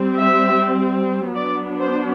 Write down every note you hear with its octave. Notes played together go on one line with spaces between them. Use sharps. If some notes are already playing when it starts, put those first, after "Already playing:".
Already playing: G3 C4
E5
F#3 B3 D4 D5
C5